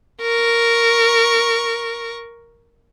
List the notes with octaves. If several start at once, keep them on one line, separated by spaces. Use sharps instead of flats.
A#4 C#6